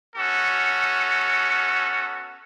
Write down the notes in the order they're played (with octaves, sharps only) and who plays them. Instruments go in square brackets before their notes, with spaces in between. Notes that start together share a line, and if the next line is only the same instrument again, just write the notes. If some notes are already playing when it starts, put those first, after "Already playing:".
[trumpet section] B3 C#4 F#4 A4